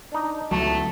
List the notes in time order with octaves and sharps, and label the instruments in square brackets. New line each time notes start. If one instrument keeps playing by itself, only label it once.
[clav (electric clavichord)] D4 D#4
[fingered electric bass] C#2 F#3 [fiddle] A3 [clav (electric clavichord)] A4